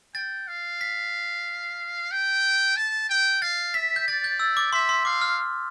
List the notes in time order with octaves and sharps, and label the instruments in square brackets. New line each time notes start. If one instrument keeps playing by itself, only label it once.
[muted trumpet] G5 [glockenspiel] A6
[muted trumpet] F5
[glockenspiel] B6
[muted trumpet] G5
A5
G5
[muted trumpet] F5 [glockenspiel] A6
[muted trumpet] E5 [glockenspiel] B6
[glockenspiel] G6
[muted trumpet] D5 [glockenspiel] A6
[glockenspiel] G6
E6
D6
[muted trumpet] E5 [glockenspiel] C6
[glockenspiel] C6
[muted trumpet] F5 [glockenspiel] D6
[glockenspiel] F6